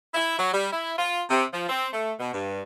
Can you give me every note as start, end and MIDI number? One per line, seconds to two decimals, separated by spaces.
0.14 0.35 64
0.38 0.52 54
0.53 0.68 55
0.72 0.93 64
0.98 1.20 65
1.30 1.44 48
1.52 1.67 53
1.69 1.87 60
1.92 2.13 57
2.20 2.30 47
2.33 2.61 43